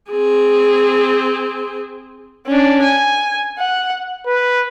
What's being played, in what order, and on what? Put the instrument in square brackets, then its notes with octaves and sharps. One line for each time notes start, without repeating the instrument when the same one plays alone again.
[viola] C4 G#4
[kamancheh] C#4 D4
G#5
F#5
[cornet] B4